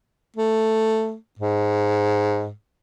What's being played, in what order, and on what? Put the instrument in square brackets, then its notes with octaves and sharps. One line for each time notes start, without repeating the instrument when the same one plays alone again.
[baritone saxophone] A3
G#2